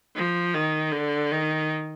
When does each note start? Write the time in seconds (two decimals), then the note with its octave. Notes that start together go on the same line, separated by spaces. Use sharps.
0.16 F3
0.55 D#3
0.92 D3
1.32 D#3